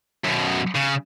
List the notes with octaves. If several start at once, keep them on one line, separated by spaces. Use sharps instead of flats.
F#2 B2
C#3